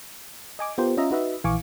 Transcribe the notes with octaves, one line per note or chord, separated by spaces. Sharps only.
D#5 G#5 D6
B3 F4 G4 A#4 C5
C#4 F4 D#5 E5 A#5
D#4 F#4 B4 D#5 E5
A#1 E3 F5 G#5 C#6 D6